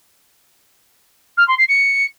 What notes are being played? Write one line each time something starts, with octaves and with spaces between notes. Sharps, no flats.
F6
C6
C7
C#7